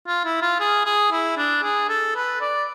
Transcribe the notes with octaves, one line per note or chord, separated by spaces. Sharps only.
F4
E4
F4
G#4
G#4
E4
D4
G#4
A4
B4
D5